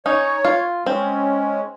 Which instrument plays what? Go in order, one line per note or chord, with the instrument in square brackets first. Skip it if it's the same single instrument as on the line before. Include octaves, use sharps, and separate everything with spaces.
[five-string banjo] C#4 D#4 [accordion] C#5
[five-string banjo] F4
[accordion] G#3 C#4 [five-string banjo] C4